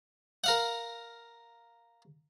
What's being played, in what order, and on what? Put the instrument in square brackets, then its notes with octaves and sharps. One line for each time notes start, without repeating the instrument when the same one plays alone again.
[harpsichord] A#4 F5 F#5